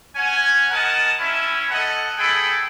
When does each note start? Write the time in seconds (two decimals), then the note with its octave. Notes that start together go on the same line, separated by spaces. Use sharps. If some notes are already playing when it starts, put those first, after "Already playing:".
0.15 C#4 F#5 G#5
0.70 A#4 D#5 F#5 A5
1.18 C#4 E4
1.69 A4 D#5 F#5
2.18 G#4 A4 G5 B5